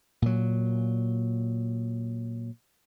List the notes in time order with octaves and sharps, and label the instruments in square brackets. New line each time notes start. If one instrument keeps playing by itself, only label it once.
[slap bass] A#2 F#3